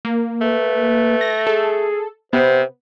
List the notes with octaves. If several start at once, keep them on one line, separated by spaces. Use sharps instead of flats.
A#3
A3 B4
A#6
G#4 A4
C3 B3 C5